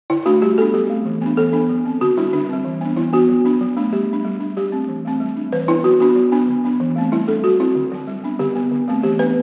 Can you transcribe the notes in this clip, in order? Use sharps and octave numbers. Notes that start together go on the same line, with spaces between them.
D3 E4
A3 D4 F#4
G3 G4
B3 D4 A4
F#3 G4
A3 C4
E3
B3 D4
E3 A4
B3 D4
F#3
C4
D3 F#4
G3 D4 E4
D3 D4
G3 C4
E3
B3 D4
E3 E4
B3 D4 F#4
F#3
B3 D4
F#3
A3 D4
G3 G4
B3 D4
G3
D4
F#3 G4
A3 C4
E3
A3 C4
G3
D4
E3 B4
B3 D4 E4
F#3 F#4
B3 D4 F#4
F#3
B3 D4
D3
F#3 B3 D4
E3
A3 C4
G3 E4
D4 A4
F#3 F#4
C4 E4
D3
F#3 C4
G3
B3 D4
D3 G4
F#3 B3
D3
F#3 A3 C4
E3 G4
B3 D4 B4